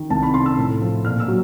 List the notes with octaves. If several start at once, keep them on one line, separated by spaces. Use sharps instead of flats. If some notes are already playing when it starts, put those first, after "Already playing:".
Already playing: D#3
C2 A5
B5
C3 C6
E6
A2
F3
A#2 F6
E6
F#3